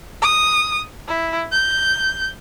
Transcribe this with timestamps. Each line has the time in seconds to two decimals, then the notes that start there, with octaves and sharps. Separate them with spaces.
0.22 D#6
1.08 E4
1.52 G6